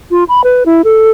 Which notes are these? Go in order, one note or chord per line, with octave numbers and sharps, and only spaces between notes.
F4
B5
B4
E4
A4